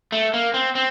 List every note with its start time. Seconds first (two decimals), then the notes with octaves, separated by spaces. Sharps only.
0.12 A3
0.34 A#3
0.54 C4
0.75 C4